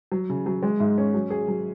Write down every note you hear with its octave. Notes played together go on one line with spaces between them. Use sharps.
F#3
C#3
F#3
G#3
G#2
C#4
F#3
G#4
F#3